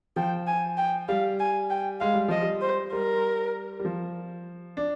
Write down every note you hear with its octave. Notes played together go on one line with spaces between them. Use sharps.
F3 G5
G#5
G5
G3 F5
G#5
G5
G#3 F5
G3
F3 D#5
G3
C5
G3 A#4
G3
F3
D4